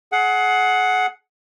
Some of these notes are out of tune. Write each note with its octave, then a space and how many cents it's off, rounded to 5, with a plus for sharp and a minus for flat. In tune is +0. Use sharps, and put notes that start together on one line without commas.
G#4 +30 F#5 +0